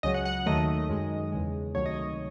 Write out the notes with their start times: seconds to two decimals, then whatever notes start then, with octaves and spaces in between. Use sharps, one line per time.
0.03 C#2 C#3 F#3 D#5
0.14 F#5
0.25 F#5
0.46 D#2 D#3 F#3 A3 D#5
0.89 F#2 D#3 G#3
1.32 E2 C#3 G#3
1.75 C#2 C3 D#3 F#3 A3 C#5
1.86 D#5
1.96 C#5